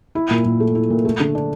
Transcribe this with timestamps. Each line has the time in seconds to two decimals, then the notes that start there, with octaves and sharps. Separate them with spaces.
0.15 E4
0.30 A#2
0.45 A#2
0.60 A3
0.75 E4
0.90 A#2
1.05 A3
1.20 D3
1.35 D4